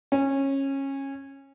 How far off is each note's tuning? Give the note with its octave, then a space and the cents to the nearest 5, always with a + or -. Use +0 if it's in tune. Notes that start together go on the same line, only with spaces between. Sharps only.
C#4 -20